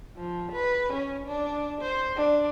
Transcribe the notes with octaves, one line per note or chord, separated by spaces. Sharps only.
F3
B4
C#4
D4
C5
D4